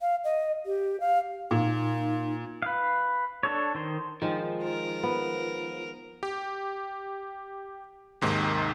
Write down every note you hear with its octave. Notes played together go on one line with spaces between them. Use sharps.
F5
D#5
G4
F5
A#2 D#4
B4 F5
D4 A4 C#5
D#3 C5
D#3 F3 G#3
A#4
B3
G4
D#2 G#2 C3 D#3